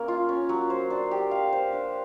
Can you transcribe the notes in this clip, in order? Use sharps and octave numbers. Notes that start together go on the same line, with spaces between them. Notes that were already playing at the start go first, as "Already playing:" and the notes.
Already playing: A#3 C#4
F4
C#4
F#3
C5
D4
G4
F5
C5
D4